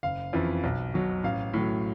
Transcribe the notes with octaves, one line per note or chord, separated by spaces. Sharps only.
F#1 F5
F2 C#3 E3
B1
B2 F#3
A1 F5
A2 F#3